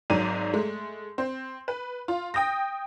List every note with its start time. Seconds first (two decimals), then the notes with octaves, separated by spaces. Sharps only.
0.10 G#1 G#2 F#3 D5 D#7
0.54 G#3 A3
1.18 C4
1.68 B4
2.08 F4
2.34 G5 D#6 G6 A#6